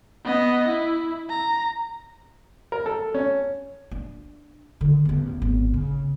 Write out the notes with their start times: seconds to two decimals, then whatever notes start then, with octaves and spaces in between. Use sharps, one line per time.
0.24 B3 D#5
0.68 E4
1.30 A#5
2.72 A#4
2.86 A4
3.14 C#4
3.91 D4
4.81 D3 D#3
5.05 A1 E2
5.42 G#1 B3
5.74 C#3